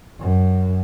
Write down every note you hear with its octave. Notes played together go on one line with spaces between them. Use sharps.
F#2